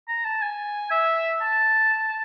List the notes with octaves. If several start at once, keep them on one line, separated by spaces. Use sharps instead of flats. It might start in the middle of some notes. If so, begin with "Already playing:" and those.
A#5
A5
G#5
E5
A5